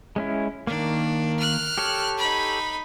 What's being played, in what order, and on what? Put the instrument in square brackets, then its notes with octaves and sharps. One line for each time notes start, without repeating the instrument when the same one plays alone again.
[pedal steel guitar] G#3 C#4 E4
[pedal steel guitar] D#3 A#3 [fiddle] D4
[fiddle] F6 F#6
[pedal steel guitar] G4 A4 C#5
[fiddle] D#4 B5